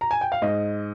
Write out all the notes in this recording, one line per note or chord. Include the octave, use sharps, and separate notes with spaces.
A#5
G#5
G5
F5
G#2 D#5